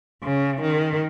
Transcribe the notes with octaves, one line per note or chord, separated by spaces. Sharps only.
C#3
D#3